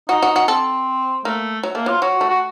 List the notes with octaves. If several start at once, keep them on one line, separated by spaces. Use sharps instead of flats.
D#4 F#4
F#4
F#4
C4 A4
A3 A#3
F#3
A3 A#3
F#3 F4
F#3 F#4
A3
F#4